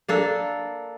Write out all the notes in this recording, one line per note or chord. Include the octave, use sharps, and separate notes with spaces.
A#3 D4 A4